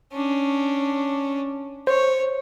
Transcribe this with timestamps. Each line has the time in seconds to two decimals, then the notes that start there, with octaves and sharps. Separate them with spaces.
0.13 C#4 D4
1.87 C5 C#5